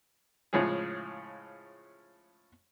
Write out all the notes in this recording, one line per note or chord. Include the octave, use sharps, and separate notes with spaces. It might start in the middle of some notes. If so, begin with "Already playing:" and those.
A2 C#3 F3 G#3 C#4 G#4